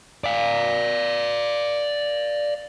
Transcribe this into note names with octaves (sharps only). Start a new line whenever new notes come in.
D5 F5